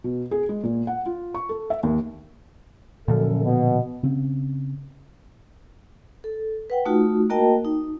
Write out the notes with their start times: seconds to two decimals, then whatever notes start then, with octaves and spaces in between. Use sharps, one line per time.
0.04 B2
0.31 G#4
0.49 G#3
0.64 A#2
0.87 F#5
1.06 F4
1.35 C#6
1.49 A4
1.70 E5
1.83 D#2
3.08 F#2 A#2 D3 F3 A4
3.43 B2
4.03 C#3 C4 C#4
6.24 A4
6.70 B4 F#5 G5
6.85 A3 D#4 F4 F#4
7.30 A#3 F#4 A#4 D#5 G5 A5
7.65 D#4